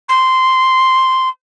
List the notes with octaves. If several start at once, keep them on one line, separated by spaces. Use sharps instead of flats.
C6